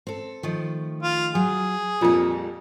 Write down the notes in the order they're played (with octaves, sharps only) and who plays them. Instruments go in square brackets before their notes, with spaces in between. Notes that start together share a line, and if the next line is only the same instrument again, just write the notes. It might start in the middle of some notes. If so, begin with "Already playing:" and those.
[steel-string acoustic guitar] C4 A4
D#3 F3 A3
[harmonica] F4
[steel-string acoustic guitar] F#3 [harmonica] G#4
[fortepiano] F2 A#2 F3 [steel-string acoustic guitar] G3 A4